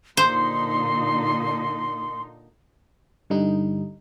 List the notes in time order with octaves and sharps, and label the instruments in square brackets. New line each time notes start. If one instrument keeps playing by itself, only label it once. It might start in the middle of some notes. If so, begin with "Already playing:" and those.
[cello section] A#2 D3 D#4 [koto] C5 [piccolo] C6
[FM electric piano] G2 D3 G3 D#4